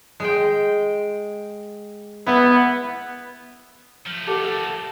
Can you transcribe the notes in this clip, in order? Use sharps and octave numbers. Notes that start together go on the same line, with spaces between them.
G#3 G5
B3 E4
F3 A3
G4 A4 A#4 F#5